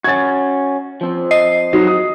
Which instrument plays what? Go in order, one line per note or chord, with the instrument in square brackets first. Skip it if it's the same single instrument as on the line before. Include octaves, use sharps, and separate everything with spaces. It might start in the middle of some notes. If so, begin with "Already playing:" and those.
[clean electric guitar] C#4 F#4 [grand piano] G#6 A6
[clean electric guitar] F3 C4
[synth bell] D#5 C7
[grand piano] F#3 D#4
D#6